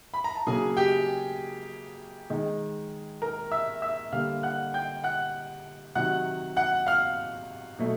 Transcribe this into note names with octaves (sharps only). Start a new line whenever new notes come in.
B5
A#5
A5
C#3 F#3 A#3 G#4 G#5
G4 G5
D#3 G#3
A#4 A#5
E5 E6
E5 E6
D3 G3 A#3 F5 F6
F#5 F#6
G5 G6
F#5 F#6
C3 D#3 F#3 F#5 F#6
F#5 F#6
F5 F6
B2 F#3 A3